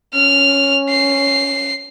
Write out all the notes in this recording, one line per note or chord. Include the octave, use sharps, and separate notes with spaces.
C#4 F6
C7